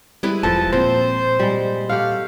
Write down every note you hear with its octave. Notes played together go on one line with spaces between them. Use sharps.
G3 G#3 E4 B4
E1 F3 A4 D#5 A5
A#2 C4 C5
G3 G#3
A3 G4 F5 F#5